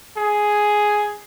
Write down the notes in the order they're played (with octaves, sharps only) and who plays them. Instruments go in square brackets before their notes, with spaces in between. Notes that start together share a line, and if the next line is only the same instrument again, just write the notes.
[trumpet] G#4